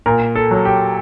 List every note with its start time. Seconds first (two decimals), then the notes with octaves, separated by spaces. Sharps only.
0.06 A#2 A#4
0.36 A4
0.51 F#3
0.65 G4